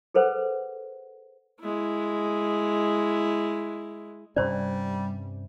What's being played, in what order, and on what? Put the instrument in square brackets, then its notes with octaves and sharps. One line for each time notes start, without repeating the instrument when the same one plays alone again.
[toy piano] G#4 A4 B4 C5 F#5
[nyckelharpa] G#3 E4
[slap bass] G2 C3 C#4 [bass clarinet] G3 [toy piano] C5 D5